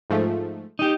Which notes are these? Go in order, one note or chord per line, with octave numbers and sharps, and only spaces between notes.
G#2 F3 A3
D#4 G4